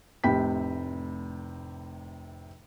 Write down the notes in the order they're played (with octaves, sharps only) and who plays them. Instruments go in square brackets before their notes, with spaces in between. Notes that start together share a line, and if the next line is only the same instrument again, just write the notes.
[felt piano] F1 A2 C3 G5 B5 B6